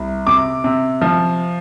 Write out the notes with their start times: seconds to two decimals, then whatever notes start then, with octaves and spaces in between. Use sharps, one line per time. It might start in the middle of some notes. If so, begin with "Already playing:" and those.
Already playing: C2
0.27 C3 D6
0.64 C3
1.02 F3